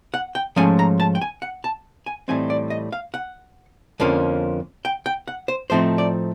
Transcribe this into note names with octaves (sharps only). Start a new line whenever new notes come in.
F#5
G5
G#2 F3 A3 C#4 G#5
A#5
A5
G5
G#5
F#5
A5
G#5
A2 E3 G3 C4 D#4 G#5
D5
D#5
F5
F#5
F2 D3 F3 A#3 C#4
G5
G5
F#5
C5
A2 F3 A3 C4 D#4 C5
D5